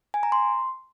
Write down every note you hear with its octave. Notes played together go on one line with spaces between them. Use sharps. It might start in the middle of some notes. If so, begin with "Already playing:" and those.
G#5
A#5
C6